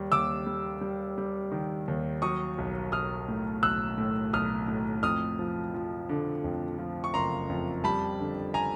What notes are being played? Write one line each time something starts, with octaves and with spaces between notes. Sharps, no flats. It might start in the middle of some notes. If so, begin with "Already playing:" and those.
Already playing: D#2 G3
D#2 D6 E6
G3
G3
G3
D#3
D#2
F#3 C#6 D#6
B1
B1 D#6 F6
A2
B1 E6 F#6
A2
B1 D#6 F6
A2
F2 D#6 F6
F3
F3
D3
F2
F3
C#6
F#1 A#5 C6
F2
G3 A5 B5
D3
G#5 A#5